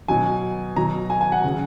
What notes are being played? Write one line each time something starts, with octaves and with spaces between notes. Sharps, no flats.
B2 F#3 G#5
B2 F#3 A#5
G#5
G#5
F#5
C#3 F#3